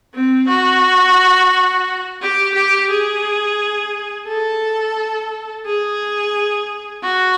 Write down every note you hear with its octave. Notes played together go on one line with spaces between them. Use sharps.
C4
F#4
G4
G4
G#4
A4
G#4
F#4